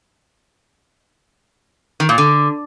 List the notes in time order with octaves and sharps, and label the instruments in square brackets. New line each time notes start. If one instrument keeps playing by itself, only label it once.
[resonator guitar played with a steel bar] D#3
A#2
D3